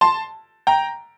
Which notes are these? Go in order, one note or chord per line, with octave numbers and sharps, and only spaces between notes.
A5 C6
G5 A#5